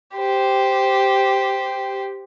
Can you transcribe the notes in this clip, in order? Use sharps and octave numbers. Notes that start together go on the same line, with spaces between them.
G4 C5